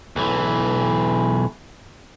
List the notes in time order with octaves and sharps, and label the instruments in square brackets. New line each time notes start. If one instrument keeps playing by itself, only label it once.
[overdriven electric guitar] B1 E3